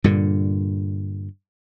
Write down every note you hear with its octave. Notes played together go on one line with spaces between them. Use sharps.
G2 A#2 D3